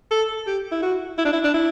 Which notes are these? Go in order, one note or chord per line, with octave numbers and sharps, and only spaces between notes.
A4
G4
E4
F#4
E4
D4
E4
D4
E4